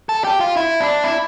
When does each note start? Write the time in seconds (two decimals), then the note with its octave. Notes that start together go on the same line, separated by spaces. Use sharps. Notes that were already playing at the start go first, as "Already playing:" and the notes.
0.09 A4
0.24 G4
0.41 F4
0.57 E4
0.80 D4
1.04 E4